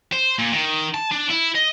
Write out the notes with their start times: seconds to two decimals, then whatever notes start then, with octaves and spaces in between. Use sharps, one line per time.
0.12 C5
0.38 A#2
0.52 D#3
0.94 A5
1.12 D4
1.30 E4
1.55 D#5